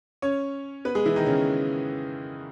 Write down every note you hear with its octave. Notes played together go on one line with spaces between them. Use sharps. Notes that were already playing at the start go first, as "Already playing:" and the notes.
C#4 C#5
B3 B4
G#3 G#4
E3 E4
D#3 D#4
C#3 C#4